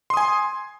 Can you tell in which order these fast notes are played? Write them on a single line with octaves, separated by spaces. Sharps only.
C6 D#6 G#5